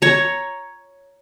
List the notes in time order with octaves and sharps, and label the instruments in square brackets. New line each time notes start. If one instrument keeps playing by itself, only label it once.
[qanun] C#5 A#5